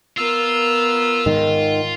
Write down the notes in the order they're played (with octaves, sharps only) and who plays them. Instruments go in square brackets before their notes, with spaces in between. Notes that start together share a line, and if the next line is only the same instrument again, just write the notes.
[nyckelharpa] B3 A#4 [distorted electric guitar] F4 [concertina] E6
[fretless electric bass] G#2 D#3